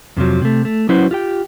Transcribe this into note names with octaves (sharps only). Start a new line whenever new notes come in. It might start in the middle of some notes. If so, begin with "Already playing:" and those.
F2 C3 F3 F#3
C3 A3
A3
F#3 C#4 E4 F#4 B4 C5
F4 G4 G5